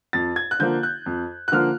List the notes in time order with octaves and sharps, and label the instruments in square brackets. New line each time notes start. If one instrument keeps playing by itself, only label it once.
[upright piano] F2 A6
G#6
F#6
D3 F3 A#3 G6
F#6
F2
F#6
D3 F3 A#3 F6